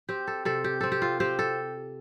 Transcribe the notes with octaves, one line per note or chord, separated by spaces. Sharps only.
C4 G4
A4
C3 A4
G4
C4 A4
G4
F4
C4 G4
A4